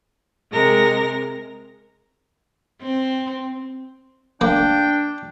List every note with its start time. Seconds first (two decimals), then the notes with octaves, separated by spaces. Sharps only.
0.52 C3 G#3 A#4 A#6
2.82 C4
4.41 A#3 D4 G5